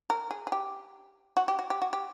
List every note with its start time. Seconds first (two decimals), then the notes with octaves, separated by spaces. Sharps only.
0.10 A#4
0.31 G#4
0.47 G#4
0.52 G4
1.37 F#4
1.48 G4
1.59 F#4
1.70 G4
1.82 F#4
1.93 G4